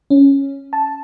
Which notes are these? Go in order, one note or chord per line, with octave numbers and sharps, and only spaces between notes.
C#4
A5